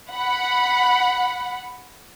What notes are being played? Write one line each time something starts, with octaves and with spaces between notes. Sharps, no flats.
F#5 B5